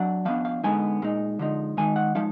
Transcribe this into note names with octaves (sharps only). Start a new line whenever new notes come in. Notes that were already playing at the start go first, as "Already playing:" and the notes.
Already playing: F#3 D4 F#5
F3 B3 D4 F5
F5
D3 G#3 B3 D#4 G#5
A#2 G#3 D#4
D3 F3 G#3 D#4
D#3 G#3 D#4 G#5
F#5
F3 G#3 D#4 F5